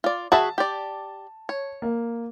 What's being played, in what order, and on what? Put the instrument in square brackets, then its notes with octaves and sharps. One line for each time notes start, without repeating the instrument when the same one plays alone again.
[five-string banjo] F4 D5
[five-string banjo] F#4 G#4 E5 [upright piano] A5
[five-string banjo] G4 D5
C#5
[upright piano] A#3